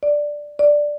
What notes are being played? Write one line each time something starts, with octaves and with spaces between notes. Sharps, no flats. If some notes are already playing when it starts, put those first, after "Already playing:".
D5
D5